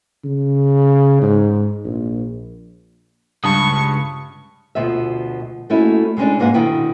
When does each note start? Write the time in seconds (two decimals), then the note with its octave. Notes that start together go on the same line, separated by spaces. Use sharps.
0.24 C#3
1.22 G#2
1.84 A#1
3.44 C#2 G2 A5 C#6 D#6
4.75 D2 B2 F3 E5
5.70 A3 A#3 C#4 D#4 E4 F#4
6.17 C3 G#3 A#3 C#4 D4
6.40 G#2 A#3 B4 F#5
6.54 B2 D3 D#3 E4 G5